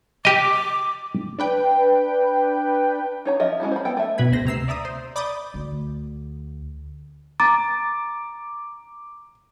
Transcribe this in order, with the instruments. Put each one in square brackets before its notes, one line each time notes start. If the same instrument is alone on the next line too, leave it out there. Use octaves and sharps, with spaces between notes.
[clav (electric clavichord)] G4 D#5 [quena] D6
[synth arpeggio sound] D4 B4 G5
[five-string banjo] D#4 C#5 A#5
F3 D#5 E5
G#3 C#4 E4 F#4
C5 B5
B3 A4 G5
A3 E5
[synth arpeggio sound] B2 B4 B5 G#6
D2 C5 A#6
C3 A#5 E6 C7
D5 E5 A#5 D#6
C5
D5 B5 D6 D#6 G6 A6
[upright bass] D2
[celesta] A#5 [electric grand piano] D6 [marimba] A6